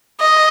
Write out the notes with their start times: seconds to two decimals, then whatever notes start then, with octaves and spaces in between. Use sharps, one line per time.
0.20 D#5